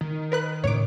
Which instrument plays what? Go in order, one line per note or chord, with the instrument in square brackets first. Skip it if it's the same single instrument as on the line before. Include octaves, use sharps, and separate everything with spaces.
[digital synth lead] D#3
[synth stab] A#4 B4 F#6
[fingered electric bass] A2 C#3 [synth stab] C#5 D6